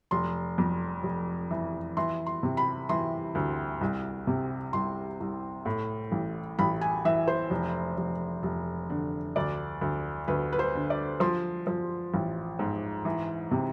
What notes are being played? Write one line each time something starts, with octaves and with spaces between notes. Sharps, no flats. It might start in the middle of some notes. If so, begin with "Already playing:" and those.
F1 C6
F2
F1
E3
E3 C6
C6
C3
B5
E3 C6
D2
C2
C3
C2 C6
C2
A2
A1
A1 B5
G#5
E3 E5
C5
F1
F1
F1
D3
D2 D5
D2
D2 B4
B4
C5
D3
D5
F3 C6
F3
A1
G#2
E3
C3